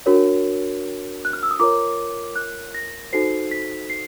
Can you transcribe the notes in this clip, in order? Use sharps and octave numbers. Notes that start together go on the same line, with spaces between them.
D4 F#4 A#4 C#5
F#6
F6
E6
D#6
F4 A#4 C#5 D6
F#6
A#6
D#4 F#4 A4 C5 C7
B6
C7